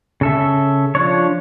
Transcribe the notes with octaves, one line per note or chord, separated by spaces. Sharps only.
C#3 A4 E5
F3 D4 C#5